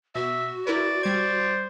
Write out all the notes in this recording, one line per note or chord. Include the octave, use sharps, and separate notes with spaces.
B2 F#4 E5
E4 A#4 B4 D5
G3 C5 D5 G#6